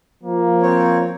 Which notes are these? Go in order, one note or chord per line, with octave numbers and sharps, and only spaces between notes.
F3 A#3
C4 C#5